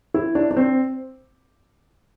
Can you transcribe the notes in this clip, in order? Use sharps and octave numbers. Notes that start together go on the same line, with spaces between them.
E4
D4
D4
C4